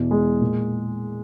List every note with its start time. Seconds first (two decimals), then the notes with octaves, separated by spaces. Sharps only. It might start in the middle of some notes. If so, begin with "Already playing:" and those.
Already playing: E2 B2
0.11 G#3
0.41 A#2